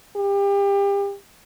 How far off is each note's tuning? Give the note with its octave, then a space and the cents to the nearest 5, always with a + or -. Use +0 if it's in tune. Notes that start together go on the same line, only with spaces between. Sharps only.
G4 +30